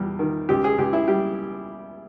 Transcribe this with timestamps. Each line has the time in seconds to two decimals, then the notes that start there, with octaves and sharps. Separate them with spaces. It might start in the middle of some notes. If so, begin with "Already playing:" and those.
Already playing: E2 G3
0.19 D#3
0.49 C#2 G4
0.64 G#4
0.78 C#2 G4
0.93 E4
1.08 G3 G4